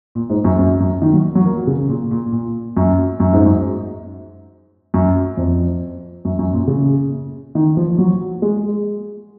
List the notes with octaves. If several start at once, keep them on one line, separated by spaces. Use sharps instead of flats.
A#2
G#2
F#2
F#2
F#2
D#3
F#3
F#3
A#3
C#3
A#2
A#2
A#2
F#2
F#2
G#2
F#2
F#2
F2
F#2
F#2
A#2
C#3
D#3
F3
F#3
G#3